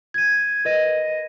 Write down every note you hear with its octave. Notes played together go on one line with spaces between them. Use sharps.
G#6 D#7
A#4 B4 D#5 A#6 D#7